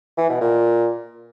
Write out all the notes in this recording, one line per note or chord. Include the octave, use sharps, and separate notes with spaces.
E3
B2
A#2